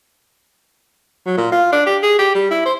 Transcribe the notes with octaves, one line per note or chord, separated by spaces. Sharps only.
F#3
A#2
F4
D4
G4
G#4
G4
G3
E4
C5